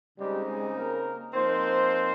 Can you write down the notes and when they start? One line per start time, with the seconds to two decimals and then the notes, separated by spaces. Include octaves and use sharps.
0.19 C#3 G3 G#3 C4 D#4 G4
0.47 G#3 G#4
0.76 A#3 A#4
1.34 F3 A#3 C4 D#4 C5